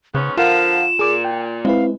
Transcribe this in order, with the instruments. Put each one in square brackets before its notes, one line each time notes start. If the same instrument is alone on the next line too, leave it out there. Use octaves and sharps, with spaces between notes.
[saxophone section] G#2 B3 C#4 [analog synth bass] C#3 [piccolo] C#6
[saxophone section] D3 F3 [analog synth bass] F4 [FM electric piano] A#4 F5 F#5 [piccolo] E7
[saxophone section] A#2 [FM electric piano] G#4 D6
[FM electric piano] G5
[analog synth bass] G#3 [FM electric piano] C4 E4 B4 [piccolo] F5